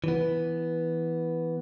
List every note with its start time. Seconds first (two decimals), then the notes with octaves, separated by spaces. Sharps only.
0.04 E3 B3